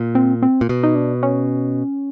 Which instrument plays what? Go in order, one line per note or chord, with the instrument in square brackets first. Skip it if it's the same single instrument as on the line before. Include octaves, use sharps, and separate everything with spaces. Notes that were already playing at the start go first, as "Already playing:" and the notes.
Already playing: [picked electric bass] A#2
[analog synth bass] C4
C4
[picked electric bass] A#2
B2
[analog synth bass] D#4
D4
C#4